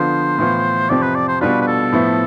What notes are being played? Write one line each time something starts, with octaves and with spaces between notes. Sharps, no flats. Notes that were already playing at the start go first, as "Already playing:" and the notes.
Already playing: D3 F3 B3 D4 F4 C5
A2 E3 B3 F4
F2 C3 F3 C4 D5
B4
D5
C5
B2 G3 D4 F4 B4
B4
A4
A2 F3 B3 E4